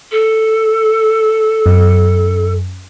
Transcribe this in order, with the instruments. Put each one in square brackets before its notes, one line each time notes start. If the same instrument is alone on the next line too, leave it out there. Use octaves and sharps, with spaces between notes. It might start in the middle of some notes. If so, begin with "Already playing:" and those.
[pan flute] A4
[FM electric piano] F#2